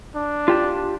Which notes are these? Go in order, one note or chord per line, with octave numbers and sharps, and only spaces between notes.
D4
F4 G4 A5